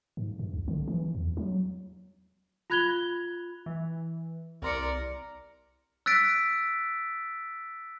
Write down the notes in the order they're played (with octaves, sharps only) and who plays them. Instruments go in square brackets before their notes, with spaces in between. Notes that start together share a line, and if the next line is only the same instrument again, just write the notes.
[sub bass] G#2
G2
C2
D3
E3
E2
F#3
[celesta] F4 B5 F#6 G#6 F7 G7
[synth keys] E3
[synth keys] C2 C6 C#7 [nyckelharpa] A#4 D5
[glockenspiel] E6 F#6 A6 B6 D7